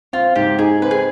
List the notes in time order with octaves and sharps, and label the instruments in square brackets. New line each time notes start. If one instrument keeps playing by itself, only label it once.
[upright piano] C4 [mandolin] F4
[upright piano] G#2 [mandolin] G4
[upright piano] D#4 [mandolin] G#4
[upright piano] C4 [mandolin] B4
[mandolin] G#4